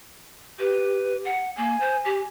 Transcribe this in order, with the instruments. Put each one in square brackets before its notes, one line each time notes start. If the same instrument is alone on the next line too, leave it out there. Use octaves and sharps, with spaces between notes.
[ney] G4 [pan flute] B4
[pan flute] F#5
[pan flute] A#3 [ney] G#5
[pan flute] C5
G4